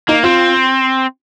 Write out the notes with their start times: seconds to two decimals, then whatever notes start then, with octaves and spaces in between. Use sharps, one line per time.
0.09 A#3 D#4
0.23 C4 F4